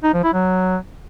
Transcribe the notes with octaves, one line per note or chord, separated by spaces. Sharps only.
D#4
F3
E4
F#3